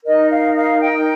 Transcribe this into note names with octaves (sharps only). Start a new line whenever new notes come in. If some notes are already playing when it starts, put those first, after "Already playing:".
D#4 A#4 D#5
F5
F5
G5